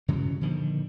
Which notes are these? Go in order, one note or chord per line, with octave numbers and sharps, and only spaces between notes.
G2 C#3 E3 F#3
A#2 D3 D#3 F3